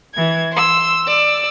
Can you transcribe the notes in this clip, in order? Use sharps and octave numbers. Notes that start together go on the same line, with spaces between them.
E3 G#6
C6 E6
D5 E6